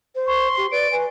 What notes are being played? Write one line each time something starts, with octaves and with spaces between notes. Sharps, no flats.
C5
C6 C#6
G4
B4 D5 D7
B4 G#5